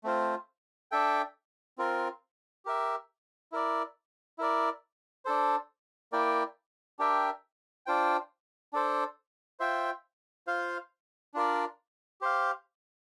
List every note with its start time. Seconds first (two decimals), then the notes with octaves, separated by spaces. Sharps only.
0.04 A3 C4 F4 C5
0.92 D4 A4 E5 G5
1.78 C4 F4 A#4
2.65 G4 A#4 E5
3.52 E4 A#4 D5
4.39 E4 A#4 D5
5.25 D4 A4 C5
6.12 A#3 E4 A#4 D5 G5
6.99 D4 G4 A#4 E5 G5
7.86 D4 F4 C5 G5
8.73 D4 A4 C5
9.60 F4 C5 E5 G5
10.47 F4 C5 F5
11.34 D4 F4 A#4 D5
12.21 G4 C5 F5